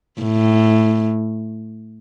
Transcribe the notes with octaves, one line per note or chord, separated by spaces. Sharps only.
A2